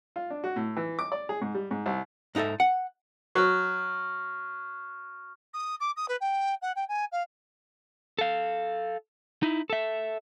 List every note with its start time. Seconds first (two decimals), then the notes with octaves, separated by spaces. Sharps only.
0.16 F4
0.30 D4
0.44 F#4
0.56 A2
0.77 E3
0.99 D6
1.12 D5
1.29 G#4
1.41 G#2
1.55 G3
1.71 G#2
1.86 C2
2.35 G#2 D#4 E4 A4 E5
2.60 F#5
3.35 F#3 C#6 F6
5.54 D#6
5.80 D6
5.96 D#6
6.08 B4
6.21 G5
6.62 F#5
6.76 G5
6.88 G#5
7.12 F5
8.19 A4 F5
9.43 D#4 E4
9.70 A4 E5